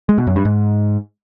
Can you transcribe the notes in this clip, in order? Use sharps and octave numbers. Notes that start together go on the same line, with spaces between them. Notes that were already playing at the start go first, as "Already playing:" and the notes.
G#3
B2
F#2
G2
G#2